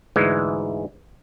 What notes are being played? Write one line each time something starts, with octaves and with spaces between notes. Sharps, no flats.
D2 G#2 E3 G#3